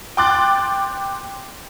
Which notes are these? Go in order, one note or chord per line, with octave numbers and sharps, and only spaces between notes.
G5 C6 D6 F#6 A6